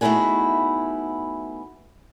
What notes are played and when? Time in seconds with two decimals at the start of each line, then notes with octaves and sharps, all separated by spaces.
0.01 A3 B3 D#4 E4 F#4 G#4